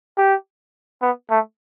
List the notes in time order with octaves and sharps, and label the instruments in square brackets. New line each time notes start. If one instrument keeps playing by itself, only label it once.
[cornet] G4
B3
A3